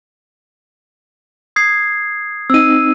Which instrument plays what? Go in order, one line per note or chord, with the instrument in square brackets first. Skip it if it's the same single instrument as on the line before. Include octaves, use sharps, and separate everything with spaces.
[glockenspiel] D#6 G#6 C7
[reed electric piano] C4 D#4 [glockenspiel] E6 D#7